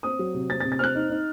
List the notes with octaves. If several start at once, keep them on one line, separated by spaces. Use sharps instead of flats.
C4 D#6
F#3
C3
C4 A6
A6
C3
A6
C4 F6 F#6
D#4
D#4